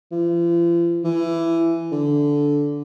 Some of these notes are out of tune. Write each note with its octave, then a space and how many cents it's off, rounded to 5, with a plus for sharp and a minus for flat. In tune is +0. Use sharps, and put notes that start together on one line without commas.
F3 -45
E3 +15
D3 -10